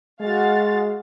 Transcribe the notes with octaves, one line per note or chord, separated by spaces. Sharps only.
G#3 F#4 F5 A6